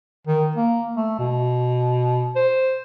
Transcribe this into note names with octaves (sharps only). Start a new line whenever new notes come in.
D#3
A#3
A3
B2
C5